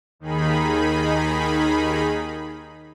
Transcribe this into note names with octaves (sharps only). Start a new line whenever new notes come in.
D#2 D#3 D#4 G#4 B5